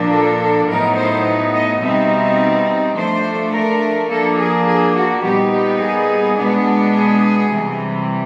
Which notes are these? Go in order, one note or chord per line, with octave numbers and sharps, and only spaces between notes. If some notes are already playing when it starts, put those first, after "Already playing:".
Already playing: A#2 F3 A#3 D4
A4
A4
A2 F#3 B3 D#4 A#4
C5
D#5
B2 G3 C4 D#4 E5
F3 A3 D4 C5
A#4
F3 A#3 D4 A4
G#4
G#4
F#4
A#2 G3 B3 D#4 G4
G4
G#4
B2 G#3 B3 D4
G#4
C3 E3 G3